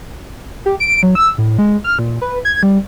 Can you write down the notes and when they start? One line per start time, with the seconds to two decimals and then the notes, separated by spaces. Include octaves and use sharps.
0.66 G4
0.80 D7
1.03 F#3
1.15 E6
1.38 A2
1.58 G#3
1.84 F6
1.99 A#2
2.22 B4
2.45 G#6
2.63 G3